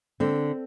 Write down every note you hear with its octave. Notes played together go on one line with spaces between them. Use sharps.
D3 C4